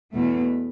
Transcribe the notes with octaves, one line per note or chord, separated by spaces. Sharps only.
E2 B2 A3